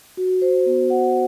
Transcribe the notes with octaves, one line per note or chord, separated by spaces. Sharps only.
F#4
C5
B3
F#5